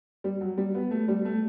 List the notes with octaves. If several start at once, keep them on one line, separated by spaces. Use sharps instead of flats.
G3
F#3
G3
B3
A3
G3
A3